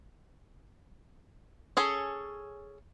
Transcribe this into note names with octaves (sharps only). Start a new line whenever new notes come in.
C#4 G#4 A4 C#5